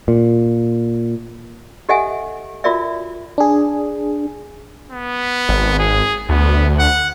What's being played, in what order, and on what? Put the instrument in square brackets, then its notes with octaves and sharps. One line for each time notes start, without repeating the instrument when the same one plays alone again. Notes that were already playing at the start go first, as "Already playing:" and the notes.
[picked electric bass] A#2
[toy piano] G4 A4 D#5 E5 F#5 G#5
F4 F#4 A#4 D5 E5
[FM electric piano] D4 G#4
[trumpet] B3
[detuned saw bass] G#1
[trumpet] G#4
[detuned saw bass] D2 [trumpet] B3
[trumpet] F#5